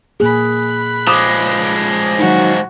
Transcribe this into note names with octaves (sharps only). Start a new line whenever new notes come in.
A#2 A#3 G#4 B5 F#6
F3 G#3 D6 D#6
D#3 F#3 F#4